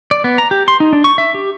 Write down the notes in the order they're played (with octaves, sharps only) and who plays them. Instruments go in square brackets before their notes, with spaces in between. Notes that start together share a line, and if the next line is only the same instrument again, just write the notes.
[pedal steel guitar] D5
B3
A#5
G4
C6
D#4
D4
C#6
E5
G4